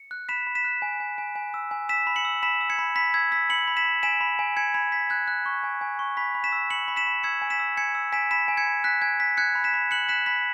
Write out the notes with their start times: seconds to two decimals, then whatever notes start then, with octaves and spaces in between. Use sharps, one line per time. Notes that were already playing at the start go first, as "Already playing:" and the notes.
Already playing: C#7
0.11 F#6
0.29 B5 B6 E7
0.47 B5
0.55 B6 E7
0.64 F#6
0.82 G#5
1.00 G#5
1.18 G#5
1.36 G#5
1.54 E6
1.71 G#5
1.89 E6 B6 E7
2.07 B5
2.16 C#7 F#7
2.25 E6
2.43 B5 B6 E7
2.61 E6
2.70 G#6 C#7
2.79 B5
2.96 B5 B6
3.14 E6 G#6
3.32 E6 B6
3.50 B5 C#7 F#7
3.68 B5
3.77 B6 E7
3.85 B5
4.03 G#5 B6 E7
4.21 B5
4.39 G#5
4.57 G#5 G#6 C#7
4.74 B5 G#6
4.92 G#5 B6
5.10 F#6 G#6
5.28 F#6
5.46 C#6
5.64 G#5
5.81 G#5
5.99 C#6
6.17 B5 B6
6.35 B5
6.44 B6 E7
6.52 E6
6.70 B5 C#7 F#7
6.88 B5
6.97 B6 E7
7.07 B5
7.23 E6 G#6 C#7
7.42 G#5
7.50 B6 E7
7.59 E6
7.77 G#5 G#6 C#7
7.95 E6
8.12 G#5 B6 E7
8.31 B5 B6 E7
8.48 G#5
8.57 G#6 C#7
8.66 B5
8.84 F#6 B6
9.02 G#5 G#6
9.20 F#6 B6
9.37 F#6 G#6 C#7
9.55 B5
9.64 B6 E7
9.74 B5
9.91 F#6 C#7 F#7
10.09 F#6 B6 E7
10.26 B5 B6